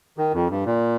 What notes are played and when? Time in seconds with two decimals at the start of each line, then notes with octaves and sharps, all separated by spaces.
0.18 D#3
0.34 F2
0.50 G2
0.66 A#2